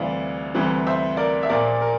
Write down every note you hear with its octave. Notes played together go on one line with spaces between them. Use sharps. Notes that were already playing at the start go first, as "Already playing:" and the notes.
Already playing: D2 C3 E3 G3 D5 F5
D2 C3 E3 G3
C5 E5
A#4 D5
E5
A#1 A#2 F3 A#4 D5
A#4